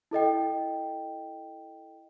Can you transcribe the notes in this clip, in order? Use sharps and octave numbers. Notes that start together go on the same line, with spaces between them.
E4 A4 D#5 G5